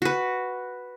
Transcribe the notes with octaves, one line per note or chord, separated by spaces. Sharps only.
F#4 B4